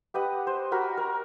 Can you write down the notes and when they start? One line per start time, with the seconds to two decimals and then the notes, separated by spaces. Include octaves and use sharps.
0.14 G4 B4 D#5 F#5
0.47 C5
0.72 F#4 A#4 B5
0.97 A#4